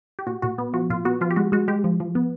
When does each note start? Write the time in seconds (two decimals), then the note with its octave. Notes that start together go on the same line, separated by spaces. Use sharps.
0.19 G4
0.27 A#2 F#4
0.42 A#2 F#4
0.58 B3
0.74 F3 F#4
0.90 A#2 F4
1.05 B3 F#4
1.21 F3 F4
1.31 G4
1.36 G#3 F#4
1.52 G#3 F#4
1.68 G#3 G4
1.84 F3
2.00 F3
2.15 B3